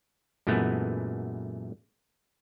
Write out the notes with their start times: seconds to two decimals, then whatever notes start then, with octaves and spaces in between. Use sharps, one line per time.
0.47 F#2 A#2 E3 G#3 A3 B3